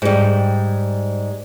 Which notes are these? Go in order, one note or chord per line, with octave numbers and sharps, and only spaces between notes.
G#2 G3